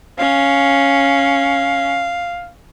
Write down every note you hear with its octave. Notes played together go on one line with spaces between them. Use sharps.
C#4 F5